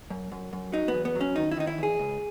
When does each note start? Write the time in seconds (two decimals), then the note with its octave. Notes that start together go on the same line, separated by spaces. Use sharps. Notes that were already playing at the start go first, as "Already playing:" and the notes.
0.10 F#2
0.32 F#2
0.53 F#2
0.72 F#3 D#4
0.88 B3
0.94 E2
1.05 B3
1.15 F#3
1.21 C#4
1.36 D#3 D#4
1.51 E4
1.57 D#3 D#4
1.67 E4
1.78 E2 G#4
1.99 C#2